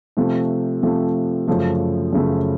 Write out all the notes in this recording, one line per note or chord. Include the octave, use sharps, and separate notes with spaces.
C3 F3 A3
C3 F3 A3
F#2 C#3 F3 A3
F#2 C#3 F3 A3